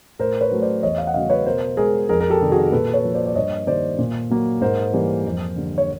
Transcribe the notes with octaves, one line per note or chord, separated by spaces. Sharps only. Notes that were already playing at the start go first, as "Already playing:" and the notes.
A2 A#4 C5
B4 C#5
F#3 A3
C5 D5
E2 C#5 D#5
D#5 F5
F#5
C#3 F#3 A3 D#5 F5
B4 C#5
B2 A#4 C5
G#3 G#4 A#4
F2 G#4 A#4
A#4
G4 A4
C3 D#3 G3
F#4 G#4
A#2 A4 B4
B4 C#5
F3 A#3
C5 D5
D5
G2 C#5 D#5
D#3 G3 A#3 C5 D5
A#2
F#3 A#3
G#2 A#4 C5
E3 G3 A#3
F2
D3 G3 A#3
C#5